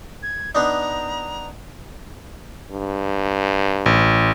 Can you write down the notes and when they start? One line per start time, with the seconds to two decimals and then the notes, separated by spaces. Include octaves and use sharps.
0.23 G#6
0.55 B3 D4 D#4 A#5
2.71 G2
3.86 A1